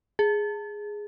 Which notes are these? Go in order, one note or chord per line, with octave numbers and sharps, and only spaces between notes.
G#4